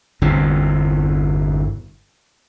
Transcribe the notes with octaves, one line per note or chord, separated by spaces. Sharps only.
G1 E2 C3